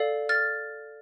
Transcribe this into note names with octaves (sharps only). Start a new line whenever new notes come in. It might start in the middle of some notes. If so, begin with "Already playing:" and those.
Already playing: A4 D5 F5
F6 A6